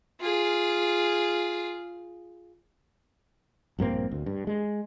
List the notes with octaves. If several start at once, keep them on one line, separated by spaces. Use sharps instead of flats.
F4 G#4
A#1 G2 A#3 C4
D2
G2
G#3